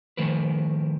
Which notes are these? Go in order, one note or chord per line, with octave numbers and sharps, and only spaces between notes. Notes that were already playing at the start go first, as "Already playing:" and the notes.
D#3 F3 A3 A#4 B4